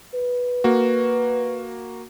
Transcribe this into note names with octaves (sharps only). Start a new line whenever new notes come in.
B4
A#3 F#4